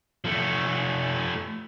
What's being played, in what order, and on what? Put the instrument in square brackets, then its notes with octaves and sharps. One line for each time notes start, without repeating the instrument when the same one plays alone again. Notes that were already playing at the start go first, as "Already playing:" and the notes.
[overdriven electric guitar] F3 A3